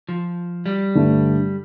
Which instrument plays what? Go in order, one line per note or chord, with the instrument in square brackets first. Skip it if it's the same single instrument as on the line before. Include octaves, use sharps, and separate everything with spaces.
[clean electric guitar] F3
G3
[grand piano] G2 D3 A3